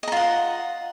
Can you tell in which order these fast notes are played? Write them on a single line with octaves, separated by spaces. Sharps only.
D#5 A#5 F4 F#5